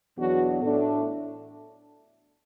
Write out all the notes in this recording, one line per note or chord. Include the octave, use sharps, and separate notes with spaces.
E2 B2 F#3 B3 D4 F#4
A2 A3 D4